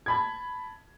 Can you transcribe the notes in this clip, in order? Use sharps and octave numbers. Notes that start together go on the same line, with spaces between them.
A5 B5 G#6